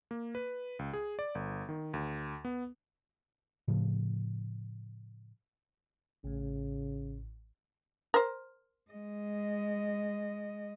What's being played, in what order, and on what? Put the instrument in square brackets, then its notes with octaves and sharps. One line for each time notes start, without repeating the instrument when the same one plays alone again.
[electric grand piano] A#3
B4
C#2
G#4
D5
G1
D#3
D2
B3
[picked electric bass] A2 C#3 F3
[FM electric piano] A1 A2 [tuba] C#3
[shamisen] A#4 C5
[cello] G#3 D#5